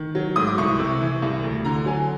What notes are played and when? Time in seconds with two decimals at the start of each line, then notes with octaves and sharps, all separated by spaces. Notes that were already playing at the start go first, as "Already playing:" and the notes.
Already playing: D#3
0.15 F#3
0.36 G#2 D#6
0.47 D6
0.58 C2 C#6
0.79 C3
1.01 E3
1.22 C2
1.43 D2
1.65 D3 A#5
1.86 F#3 G#5